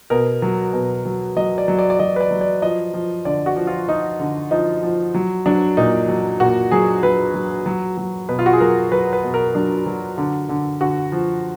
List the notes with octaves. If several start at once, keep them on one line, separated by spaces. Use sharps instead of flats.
B2 A#4
F#3
B2
F#3
F#3 D#5
D5
F#3
D5
D5
F#3 D#5
B4
D5
F#3
D5
F3 D#5
F3
D3 D5
F#4
F3
F4
F3 D#4
D3
F3 D#4
F3
F#3
F#3 D4
A#2 D#4
F#3
A#2 F#4
F#3 G#4
F#3 B4
F#3
F#3
F#3
B2 B4
F4
F#4
G#4
F#3 A#4
F#3 B4
B4
B2
A#4
F#3 D4
F#3
D3
D3
D3 F#4
F3